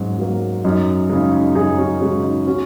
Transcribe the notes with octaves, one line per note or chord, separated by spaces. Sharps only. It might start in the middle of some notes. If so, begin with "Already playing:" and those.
Already playing: G#2 F#3 C#4
F#3 A#3
F#2 D#4
C#3 G#3 D#4
D#4
F#2 D#4 G#4
C#4 F#4
C#3 G#3 C#4 F#4
D#4
C#4 F#4